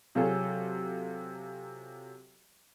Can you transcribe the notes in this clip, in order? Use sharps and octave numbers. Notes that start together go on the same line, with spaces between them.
C3 F#3 F4 F#4 G#4 A4